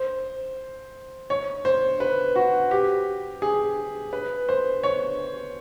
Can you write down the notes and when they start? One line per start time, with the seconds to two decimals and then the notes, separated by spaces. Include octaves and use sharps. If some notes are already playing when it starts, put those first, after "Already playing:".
Already playing: C5
1.30 C#5
1.65 C5
2.00 B4
2.36 F#4
2.71 G4
3.42 G#4
4.13 B4
4.49 C5
4.83 C#5